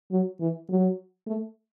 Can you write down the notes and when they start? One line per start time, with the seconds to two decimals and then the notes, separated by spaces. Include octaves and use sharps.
0.11 F#3
0.40 E3
0.69 F#3
1.27 A3